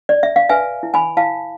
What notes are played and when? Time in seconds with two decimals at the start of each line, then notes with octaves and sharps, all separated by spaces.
0.09 D5
0.23 E5
0.36 F5
0.49 B4 E5 G#5
0.83 E4
0.94 G#5 B5
1.17 E4 F5 A5